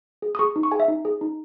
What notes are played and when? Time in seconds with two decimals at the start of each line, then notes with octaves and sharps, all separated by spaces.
0.22 G#4
0.35 D#6
0.39 G#4 C#6
0.56 D#4
0.63 C#6
0.72 G#4 G#5
0.80 E5
0.88 D#4
1.05 G#4
1.21 D#4